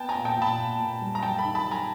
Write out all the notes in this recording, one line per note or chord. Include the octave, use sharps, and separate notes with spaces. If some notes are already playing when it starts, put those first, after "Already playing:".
Already playing: B3 G5 A5
G#5 A#5
A#2
G5 A5
A#2
A5 B5
A#2
A#2
G3
A#5
F#2 G5 A5
A5 B5
D#3
A5 B5
F#2
G#5 A#5